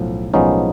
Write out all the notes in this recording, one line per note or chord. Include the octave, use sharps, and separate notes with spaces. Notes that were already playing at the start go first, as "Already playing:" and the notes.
Already playing: B1 A2 F3
B1 A2 F3 G#3 B3 C#4 D#4